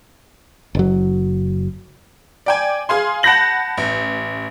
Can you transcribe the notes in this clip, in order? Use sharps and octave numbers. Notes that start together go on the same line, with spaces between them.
F#1 F#3
D5 G5 G#5
G#4 F5 G#5 C6
F#5 A5 B5 G6 A#6 F#7
A1